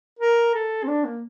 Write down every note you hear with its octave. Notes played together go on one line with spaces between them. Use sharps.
A#4
A4
C4
D4
A#3